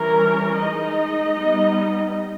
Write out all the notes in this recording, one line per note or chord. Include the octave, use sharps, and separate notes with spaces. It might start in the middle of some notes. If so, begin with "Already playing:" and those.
Already playing: E3 G3 C#4 A#4
G#3 D#4 D#5
G3 B3 D#4